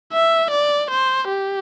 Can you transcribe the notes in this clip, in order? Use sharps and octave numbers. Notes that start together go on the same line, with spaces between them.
E5
D5
C5
G4